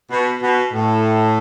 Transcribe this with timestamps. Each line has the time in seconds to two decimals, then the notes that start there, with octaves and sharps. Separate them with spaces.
0.11 B2
0.42 B2
0.73 A2